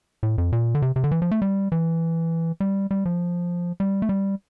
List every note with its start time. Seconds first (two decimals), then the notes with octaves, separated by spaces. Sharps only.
0.23 A2
0.38 F2
0.52 A#2
0.75 D3
0.82 C3
0.96 C3
1.04 D3
1.11 E3
1.22 F3
1.31 A3
1.42 G3
1.72 E3
2.60 G3
2.91 G3
3.05 F3
3.80 G3
4.02 A3
4.09 G3